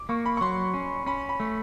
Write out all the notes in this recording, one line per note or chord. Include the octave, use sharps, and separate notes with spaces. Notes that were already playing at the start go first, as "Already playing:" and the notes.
Already playing: D6
A#3 C#6
B5
C#6
F#3 C6
C#4
C#4 B5
B5
A3